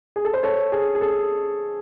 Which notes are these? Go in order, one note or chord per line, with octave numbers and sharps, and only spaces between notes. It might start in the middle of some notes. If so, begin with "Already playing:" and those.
G#4
A4
C5
A4 C#5
G#4
G#4
A4